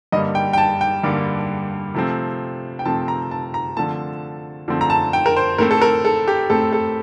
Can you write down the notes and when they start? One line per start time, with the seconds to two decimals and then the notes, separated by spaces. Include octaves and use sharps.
0.12 G2 D3 G3 A#3 D#5
0.35 G5
0.53 G5
0.58 A5
0.81 G5
1.04 G2 D3 G3 A#3
1.94 C3 F3 A3 C4
2.79 G5
2.85 C3 F3 A3 C4 A5
3.08 A#5
3.31 A5
3.54 A#5
3.76 D3 F3 A3 C4 A5
4.68 D3 F3 A3 C4
4.81 A#5
4.90 A5
5.13 G5
5.26 A#4
5.36 C5
5.58 A2 A3 C4 A#4
5.71 A4
5.82 A#4
6.05 A4
6.28 G4
6.50 A2 A3 C4 A4
6.73 A4